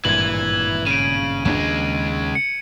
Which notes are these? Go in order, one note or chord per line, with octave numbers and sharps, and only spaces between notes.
G#1 G2 A#2 E3 G#6 F#7
C#3 D7 D#7
D#2 C#3 G#3 A3 D4
C#7